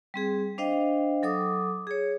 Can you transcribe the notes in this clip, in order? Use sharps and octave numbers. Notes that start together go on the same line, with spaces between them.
G3 C4 G#4
D4 C5 D#5 F5 G5
F#3 A4 D6 D#6
G#4 C#5